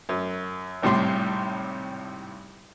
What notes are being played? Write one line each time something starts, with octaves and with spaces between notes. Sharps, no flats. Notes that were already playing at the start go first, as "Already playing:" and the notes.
F#2
G#1 A2 C3 G3 C6